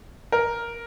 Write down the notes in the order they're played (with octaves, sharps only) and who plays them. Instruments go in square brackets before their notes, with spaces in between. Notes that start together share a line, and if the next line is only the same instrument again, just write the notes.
[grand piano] A#4